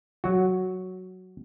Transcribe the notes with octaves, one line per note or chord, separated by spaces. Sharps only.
F#3 F#4